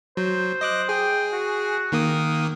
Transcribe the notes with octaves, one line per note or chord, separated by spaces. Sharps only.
F#3 C5
D#5 D6 F#6
G#4 G5
F#4
D#3 A#3 D#6